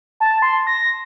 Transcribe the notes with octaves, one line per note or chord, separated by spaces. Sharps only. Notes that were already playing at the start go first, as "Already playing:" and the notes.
A5
C6
A#6